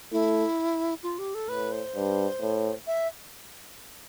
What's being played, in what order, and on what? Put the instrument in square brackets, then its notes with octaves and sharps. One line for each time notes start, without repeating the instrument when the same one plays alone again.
[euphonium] A3 [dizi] E4
[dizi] F4
G4
A4
[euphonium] A2 [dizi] B4
[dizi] C5
[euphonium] G2
A2
[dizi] E5